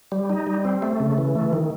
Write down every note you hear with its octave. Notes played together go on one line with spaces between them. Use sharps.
G3
D#4
G3
C4
A3
C#3
E3
A3
D#3